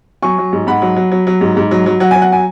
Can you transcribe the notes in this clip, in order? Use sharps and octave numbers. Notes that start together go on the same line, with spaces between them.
F#3 G#5 C#6
F#3
G#2
G#2 F#5 B5
F#3
F#3
F#3
F#3
G#2
G#2
F#3
F#3
F#3 F#5
F#3 G#5
F#5
G#5